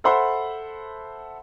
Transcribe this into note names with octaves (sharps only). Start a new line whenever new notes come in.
A4 C5 E5 F#5 B5 C6